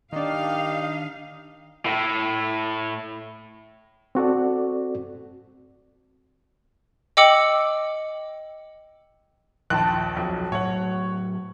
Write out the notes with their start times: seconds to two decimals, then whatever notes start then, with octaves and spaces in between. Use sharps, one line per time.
0.13 D#3 D4 D#4 G4 F5
1.85 A2
4.15 C4 F#4 A4 D5
7.17 D#5 G5 D6 E6 C#7 F#7
9.70 A#1 D#2 A5 F#6
10.16 B1 F2
10.52 A2 F#3 C#5 F#5